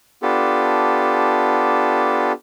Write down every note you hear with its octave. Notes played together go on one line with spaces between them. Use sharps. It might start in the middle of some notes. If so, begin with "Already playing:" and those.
B3 D4 F4 G4 A4